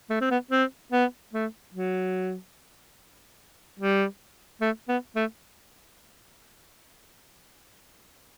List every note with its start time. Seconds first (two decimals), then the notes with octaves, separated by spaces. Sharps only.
0.10 A3
0.21 C4
0.31 B3
0.51 C4
0.92 B3
1.33 A3
1.74 F#3
3.79 G3
4.61 A3
4.89 B3
5.16 A3